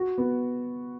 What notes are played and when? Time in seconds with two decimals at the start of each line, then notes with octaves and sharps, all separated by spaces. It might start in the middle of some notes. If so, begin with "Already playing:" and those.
Already playing: F#4
0.18 B3